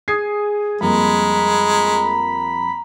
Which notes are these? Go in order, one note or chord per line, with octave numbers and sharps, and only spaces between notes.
G#4 D#6 G#6 C7
F2 G3 G#3 A#3 A#5 B5